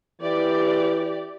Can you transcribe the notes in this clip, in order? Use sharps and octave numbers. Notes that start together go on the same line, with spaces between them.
E3 G4 D5